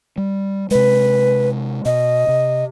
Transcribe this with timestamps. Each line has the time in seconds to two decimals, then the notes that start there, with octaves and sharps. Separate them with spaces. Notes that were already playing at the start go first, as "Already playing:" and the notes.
0.18 G3
0.71 C3 G#3 B4
1.85 B2 D#5
2.28 C3